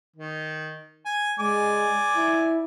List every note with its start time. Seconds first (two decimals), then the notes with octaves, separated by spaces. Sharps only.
0.16 D#3
1.06 G#5
1.39 G#3 D5 G#5 D6
2.17 E4